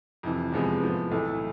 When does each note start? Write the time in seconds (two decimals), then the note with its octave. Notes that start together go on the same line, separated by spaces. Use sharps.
0.23 F2 C3 E3
0.52 E2 C3 F3 G#3 B3
0.83 A2 F3 B3
1.11 B1 A2 E3 A3